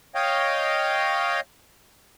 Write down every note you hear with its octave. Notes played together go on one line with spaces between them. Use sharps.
C#5 D#5 F5 G5